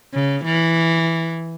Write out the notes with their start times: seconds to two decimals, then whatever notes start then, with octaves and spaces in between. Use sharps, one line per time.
0.14 C#3
0.45 E3